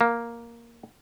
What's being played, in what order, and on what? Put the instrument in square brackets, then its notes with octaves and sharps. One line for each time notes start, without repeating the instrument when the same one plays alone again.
[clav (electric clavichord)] A#3